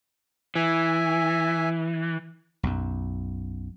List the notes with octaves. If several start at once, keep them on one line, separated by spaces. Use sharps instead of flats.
E3 E5 G#5
B1 F#2